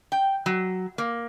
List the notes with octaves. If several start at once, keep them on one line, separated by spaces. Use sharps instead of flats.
G5
F#3
A#3